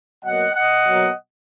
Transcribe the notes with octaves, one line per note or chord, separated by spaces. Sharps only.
B2 F#3 A#3 D#5 F#5
D#5 F#5
B2 F#3 A#3